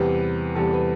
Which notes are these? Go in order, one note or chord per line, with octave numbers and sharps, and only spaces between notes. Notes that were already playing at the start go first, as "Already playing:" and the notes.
Already playing: E2 C3 G3 B4
E2 C3 G3 A4
B4